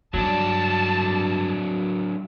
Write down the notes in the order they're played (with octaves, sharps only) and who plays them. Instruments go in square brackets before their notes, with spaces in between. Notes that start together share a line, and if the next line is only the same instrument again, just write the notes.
[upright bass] G2 [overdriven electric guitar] F#3 D4 [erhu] A5